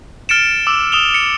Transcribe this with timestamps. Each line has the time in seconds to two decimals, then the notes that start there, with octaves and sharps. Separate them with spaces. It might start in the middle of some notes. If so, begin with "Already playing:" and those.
0.29 F6 A6 C#7 D7 E7
0.67 D6 E6
0.92 D#6 E7 F7 G7
1.14 C#7 E7